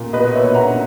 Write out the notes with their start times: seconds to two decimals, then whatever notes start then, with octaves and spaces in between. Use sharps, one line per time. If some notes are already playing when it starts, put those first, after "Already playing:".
Already playing: A#2
0.13 B2 B4 D#5
0.35 C#5 E5
0.44 B2
0.55 F#5 A#5